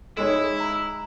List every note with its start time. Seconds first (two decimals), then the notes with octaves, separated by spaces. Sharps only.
0.17 G#3 D#4 E4 C#5
0.60 A#5